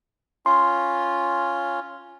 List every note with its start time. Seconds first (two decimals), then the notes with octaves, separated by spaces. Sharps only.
0.46 C#4 F4 C6